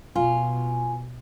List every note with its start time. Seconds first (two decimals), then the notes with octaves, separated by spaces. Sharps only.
0.16 B2 F4 G#5